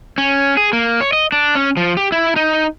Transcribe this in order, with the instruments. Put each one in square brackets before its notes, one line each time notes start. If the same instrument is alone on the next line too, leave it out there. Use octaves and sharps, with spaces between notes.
[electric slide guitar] C#4
G#4
A#3
C#5
D#5
D4
C#4
F3
G4
E4
D#4